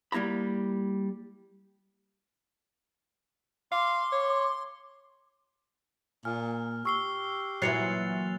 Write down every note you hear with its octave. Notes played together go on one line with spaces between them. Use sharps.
G3 A#3 E4 A#5 B5
F5 C6 D6
C#5
A#2 G#5 F6
G4 C#6 E6 C7 G7
A#2 E3 F#3 F#6 A6 C7 C#7 F7